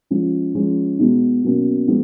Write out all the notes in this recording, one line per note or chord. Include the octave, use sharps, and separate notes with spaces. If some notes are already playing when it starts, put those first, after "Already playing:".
F3 G#3 C#4
F3 G#3 C#4
B2 G#3 B3 D#4
B2 F#3 A#3 C#4
F3 G#3 B3 D#4